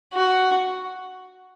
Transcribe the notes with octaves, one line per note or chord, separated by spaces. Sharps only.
F#4